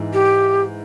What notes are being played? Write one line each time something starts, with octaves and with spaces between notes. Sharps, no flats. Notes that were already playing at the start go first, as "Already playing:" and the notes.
Already playing: G#2 E3 G#3 E4
G4